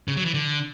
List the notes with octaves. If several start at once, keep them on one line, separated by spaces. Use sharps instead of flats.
C#3
F#3
E3
D3